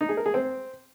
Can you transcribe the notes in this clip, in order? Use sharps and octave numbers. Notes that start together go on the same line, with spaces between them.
D#4
G#4
A#4
G#4
C4